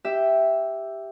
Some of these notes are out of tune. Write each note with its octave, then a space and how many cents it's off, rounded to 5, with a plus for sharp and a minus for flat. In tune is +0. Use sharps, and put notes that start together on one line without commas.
G4 +0 E5 +0